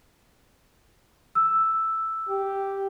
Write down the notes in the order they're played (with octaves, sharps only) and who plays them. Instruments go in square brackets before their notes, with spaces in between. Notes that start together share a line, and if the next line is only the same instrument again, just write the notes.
[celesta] E6
[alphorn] G4